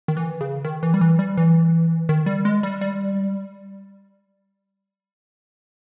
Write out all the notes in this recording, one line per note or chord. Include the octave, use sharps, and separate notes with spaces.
D#3
E3
C#3
D#3
E3
G3
E3
G3
E3
D#3
G3
G#3
G3
G3